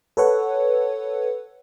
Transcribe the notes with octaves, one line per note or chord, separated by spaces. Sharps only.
A4 B4 C#5 F#5